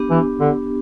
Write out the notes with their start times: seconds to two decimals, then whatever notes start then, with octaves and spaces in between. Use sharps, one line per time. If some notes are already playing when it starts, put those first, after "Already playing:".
Already playing: B3 D4 G4
0.10 E3
0.40 D3